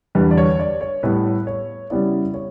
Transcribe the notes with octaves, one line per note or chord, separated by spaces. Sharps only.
E2 D3 G3 B4
D5
C#5
D5
C#5
A2 G3 B3 B4
C#5
C#3 G3 B3 E4 D5
C#5